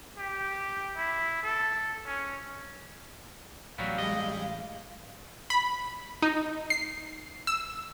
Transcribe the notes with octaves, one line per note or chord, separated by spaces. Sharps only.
G4
E4
A4
C#4
A1 F#3 G3 B3 F5
G3 G#3 D#5
B5
D#4
C7
E6